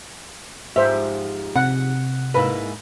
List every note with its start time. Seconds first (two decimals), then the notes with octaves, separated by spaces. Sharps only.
0.76 G#2 F3 G4 C5 E5
1.56 C3 F#5
2.34 G#2 A#3 E4 B4